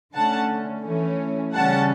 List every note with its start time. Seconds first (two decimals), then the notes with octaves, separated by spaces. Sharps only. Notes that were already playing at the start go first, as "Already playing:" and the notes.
0.15 D3 A3 C#4 F#5 A5
0.85 E3 A3 C#4
1.54 C#3 E3 G3 C#4 F#5 A5